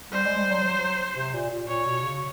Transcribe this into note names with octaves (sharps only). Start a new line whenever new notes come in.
G3 C5
G#3
G3
F#3
F#3
C3
A#2
A#2
A#2 C#5
B2
C#3